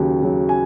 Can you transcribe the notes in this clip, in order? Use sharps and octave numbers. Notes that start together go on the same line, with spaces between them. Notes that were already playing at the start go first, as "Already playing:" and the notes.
Already playing: D#2 C#3 F#3
C#3 F#3
G#5